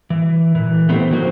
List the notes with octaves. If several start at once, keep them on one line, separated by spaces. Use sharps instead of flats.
E3
A#2 E3
A3 B3 C4 E4 G4
D#3 F3 F#3 A#3 F#4 C5